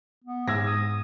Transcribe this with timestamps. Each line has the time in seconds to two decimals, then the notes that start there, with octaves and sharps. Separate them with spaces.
0.24 B3
0.48 G#2 E6 G#6 A#6
0.67 D#6